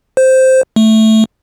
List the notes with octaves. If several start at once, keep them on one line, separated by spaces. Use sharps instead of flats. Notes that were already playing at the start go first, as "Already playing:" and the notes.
C5
A3